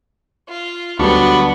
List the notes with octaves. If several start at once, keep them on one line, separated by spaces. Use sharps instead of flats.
F4
D2 D3 F#3 G3 B3 D4 B5 C#6